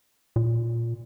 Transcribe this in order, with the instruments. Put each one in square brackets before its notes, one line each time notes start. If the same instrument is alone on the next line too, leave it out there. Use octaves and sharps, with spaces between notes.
[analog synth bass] A#2